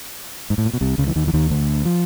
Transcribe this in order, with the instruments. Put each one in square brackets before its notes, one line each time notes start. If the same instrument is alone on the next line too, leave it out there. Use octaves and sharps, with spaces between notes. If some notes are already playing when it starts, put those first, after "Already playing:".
[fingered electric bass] G#2
A2
A#2
B2
C2 C3
C#2 C#3
E3
D#2 D#3
E3
D#2 D#3
D2 D3
F3